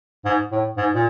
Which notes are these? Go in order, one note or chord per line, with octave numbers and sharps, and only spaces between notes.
G#2
A2
G#2
A#2